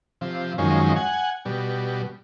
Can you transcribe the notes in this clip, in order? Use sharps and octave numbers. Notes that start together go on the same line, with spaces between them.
C3 F3
F#2 D#3 F3 G#3 C#4
F#5 G#5
B2 G3